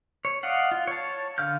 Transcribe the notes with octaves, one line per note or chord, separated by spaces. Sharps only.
C#5
D5 D#5 F5 F#5
F4
C#5 A5
D3 F5 F6 G6